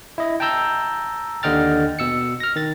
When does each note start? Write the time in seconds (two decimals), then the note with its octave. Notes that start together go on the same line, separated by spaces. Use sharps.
0.18 E4 D#5
0.40 G5 A5 A#5 E6 G6
1.43 D#2 D3 D#5 G5 F6 A6
1.99 B2 E6 C#7
2.40 F6 A#6
2.56 D#3 A6